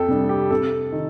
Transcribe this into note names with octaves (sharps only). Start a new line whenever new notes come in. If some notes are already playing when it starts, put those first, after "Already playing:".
Already playing: F2 A4 G5
C3 G3 D4
G4
C3 A4
D#3